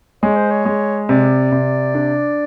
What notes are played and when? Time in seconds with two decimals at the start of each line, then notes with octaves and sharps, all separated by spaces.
0.23 G#3 C#5
0.36 C5
0.51 C#5
0.65 G#3
1.09 C3 D5
1.52 C3
1.95 D4